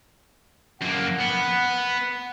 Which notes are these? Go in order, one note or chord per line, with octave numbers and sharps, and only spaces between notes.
F#2 A#3 F#5
B3